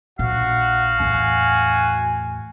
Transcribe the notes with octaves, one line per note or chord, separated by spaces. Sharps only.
A#1 F#4 F5 F#5
E2 A2 G#5